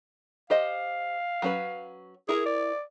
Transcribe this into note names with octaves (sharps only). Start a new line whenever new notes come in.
G4 C5 D#5 F5
F#3 C#4 B4
E4 G#4 A#4
D5